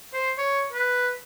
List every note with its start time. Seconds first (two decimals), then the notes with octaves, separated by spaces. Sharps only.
0.13 C5
0.38 C#5
0.72 B4